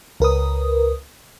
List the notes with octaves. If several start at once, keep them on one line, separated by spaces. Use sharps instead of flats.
C#2 A#4 B4 D#6